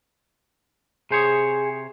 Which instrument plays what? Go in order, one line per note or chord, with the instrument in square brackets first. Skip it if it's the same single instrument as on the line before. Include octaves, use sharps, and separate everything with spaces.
[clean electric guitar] C3 C5 C#5 [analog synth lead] G#4